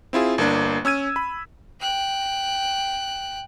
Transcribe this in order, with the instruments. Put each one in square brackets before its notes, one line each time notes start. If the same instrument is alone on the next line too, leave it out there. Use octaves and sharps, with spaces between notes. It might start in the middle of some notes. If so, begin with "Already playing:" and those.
[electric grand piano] C4 E4 F4 G#4
G1 A#3 D4
C#4 E6 G#6 D#7
B5
[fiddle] G5 F#6